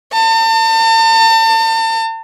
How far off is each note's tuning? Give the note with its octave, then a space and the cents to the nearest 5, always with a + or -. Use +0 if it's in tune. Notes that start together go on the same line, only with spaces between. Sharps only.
A5 +40